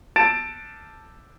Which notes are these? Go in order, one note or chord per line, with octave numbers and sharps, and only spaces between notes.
A5 A6 D7 E7